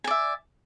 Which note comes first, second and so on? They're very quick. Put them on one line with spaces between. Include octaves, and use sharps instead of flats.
G#5 D5 E5